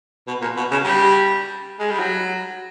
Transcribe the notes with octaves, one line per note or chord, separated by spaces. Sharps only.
B2
A#2
B2
C#3
G3
G#3
G3
F#3